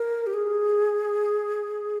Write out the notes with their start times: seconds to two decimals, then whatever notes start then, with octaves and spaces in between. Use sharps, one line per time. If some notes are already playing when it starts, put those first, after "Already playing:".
Already playing: A#4
0.27 G4
0.34 G#4